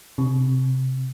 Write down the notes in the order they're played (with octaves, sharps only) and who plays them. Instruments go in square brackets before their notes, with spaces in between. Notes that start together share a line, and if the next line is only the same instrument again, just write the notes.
[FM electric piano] C3